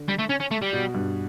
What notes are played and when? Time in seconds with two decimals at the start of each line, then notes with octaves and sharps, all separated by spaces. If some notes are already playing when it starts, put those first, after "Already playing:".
Already playing: D3
0.09 G3
0.19 A3
0.30 C#4
0.41 C#4
0.51 A3
0.62 G3
0.73 B2
0.94 G2